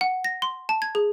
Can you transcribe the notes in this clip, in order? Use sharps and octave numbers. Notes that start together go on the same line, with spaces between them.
F#5
A#6
C6
A5
G#6
G#4